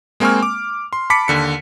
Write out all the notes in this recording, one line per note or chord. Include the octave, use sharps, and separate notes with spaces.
G#3 A#3 C4 G#5 C#6 F6
D6
C6
A5 B5 D6 B6 C#7
D#2 D3 C#7